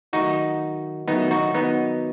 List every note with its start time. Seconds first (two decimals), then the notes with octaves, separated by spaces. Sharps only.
0.13 D#3 F#3 A3 D#4 F#4
1.08 D#3 F#3 A3 B3 D#4
1.31 D#4 F#4
1.54 B3 D#4